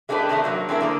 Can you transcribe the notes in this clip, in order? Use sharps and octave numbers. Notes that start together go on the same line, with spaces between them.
G#3 A#3 D4 E4 G4 B4
C3 D#3 A3 D4
G2 C3 F#3 A#3
G#3 C4 D4 E4 F#4 A#4
D3 F3 A#3